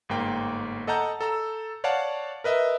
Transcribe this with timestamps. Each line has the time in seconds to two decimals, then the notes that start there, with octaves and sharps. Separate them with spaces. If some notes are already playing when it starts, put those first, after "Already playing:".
0.09 G1 G#2 A#3 G5
0.87 A4 D#5 F#5 A5 A#5 G6
1.21 A4 A#5 E6
1.84 C#5 D5 F5 F#5 A5
2.44 A#4 B4 D#5 E5